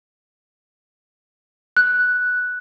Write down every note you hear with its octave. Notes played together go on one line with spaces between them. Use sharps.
F#6